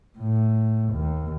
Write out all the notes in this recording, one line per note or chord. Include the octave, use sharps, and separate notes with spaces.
A2
D#2